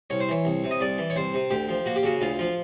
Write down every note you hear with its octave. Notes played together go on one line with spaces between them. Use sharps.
C2 C#5
C5
E3 C#5
C2
C3
D#5
C2 D5
E3
C#5
C2 C5
C3
D2 G4
F3
A#3 F#4
G4
C#3 F#4
D2 F4
F3 F4